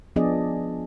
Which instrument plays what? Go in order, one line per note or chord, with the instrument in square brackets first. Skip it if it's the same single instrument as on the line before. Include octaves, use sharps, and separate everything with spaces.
[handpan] F3 B3 D4 G#4 D5 D#5